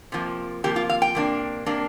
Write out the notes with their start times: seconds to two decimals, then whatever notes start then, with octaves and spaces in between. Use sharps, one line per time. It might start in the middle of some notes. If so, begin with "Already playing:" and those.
0.12 C3 F3 A#3
0.64 C3 F3 A#3 G4
0.76 F4
0.89 F5
1.02 G5
1.15 C3 A#3 D4
1.66 C3 A#3 D4